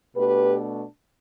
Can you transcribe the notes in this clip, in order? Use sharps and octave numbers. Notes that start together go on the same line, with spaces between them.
B2 A3 D4 G4 B4